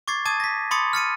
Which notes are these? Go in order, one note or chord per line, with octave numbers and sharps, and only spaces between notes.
C#6 D6 G#6 A6 C7
A5 D6 D#6 G#6 A6 D#7
A#6 B6
B5 C6 D6 D#6 A6 C#7
F6 A6 C#7 D#7